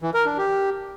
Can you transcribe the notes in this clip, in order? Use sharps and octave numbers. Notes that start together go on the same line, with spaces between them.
E3
A#4
D4
G4